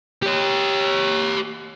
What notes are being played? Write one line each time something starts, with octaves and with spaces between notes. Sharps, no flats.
G4 C#5